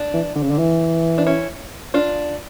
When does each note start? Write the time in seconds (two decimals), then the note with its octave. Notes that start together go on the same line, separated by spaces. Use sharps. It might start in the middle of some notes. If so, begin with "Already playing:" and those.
Already playing: D4
0.14 E3
0.36 D3
0.43 C#3
0.50 D3
0.58 E3
1.18 D4
1.27 C#4 E4
1.94 D4 F4